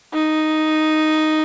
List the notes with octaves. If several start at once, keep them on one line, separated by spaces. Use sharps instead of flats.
D#4